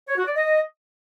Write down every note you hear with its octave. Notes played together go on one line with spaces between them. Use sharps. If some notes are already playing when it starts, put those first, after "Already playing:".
C#5
F#4
D5
D#5